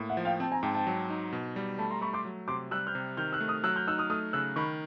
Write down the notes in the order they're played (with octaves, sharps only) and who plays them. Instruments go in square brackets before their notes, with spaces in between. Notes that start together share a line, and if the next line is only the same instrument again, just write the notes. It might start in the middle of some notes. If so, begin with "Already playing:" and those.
Already playing: [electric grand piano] A2 A#3
[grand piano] E5 F#5
[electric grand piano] F3
[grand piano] F5 G5
[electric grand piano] C4 [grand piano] G5 A5
[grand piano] G#5 A#5
[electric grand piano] G#2 [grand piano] G5 A5
[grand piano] G5 A5
[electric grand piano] F#3
D#4
B2
G3
[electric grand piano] A3 [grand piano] A5 B5
[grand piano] A#5 C6
[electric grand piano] A3 [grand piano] B5 C#6
[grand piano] C6 D6
[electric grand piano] F#3
[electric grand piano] C3 [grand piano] C6 D6
[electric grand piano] G3 [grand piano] E6 F#6
[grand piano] F6 G6
[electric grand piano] C3
[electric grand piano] D#3 [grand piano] F6 G6
[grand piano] E6 F#6
[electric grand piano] A3
[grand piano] D#6 F6
[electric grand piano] F#3 [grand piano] E6 F#6
[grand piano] F6 G6
[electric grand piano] D#4 [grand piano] E6 F#6
[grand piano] D#6 F6
[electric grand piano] A3 [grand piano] D#6 F6
[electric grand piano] C#3 [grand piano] E6 F#6
[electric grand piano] D#3 [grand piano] B5 C#6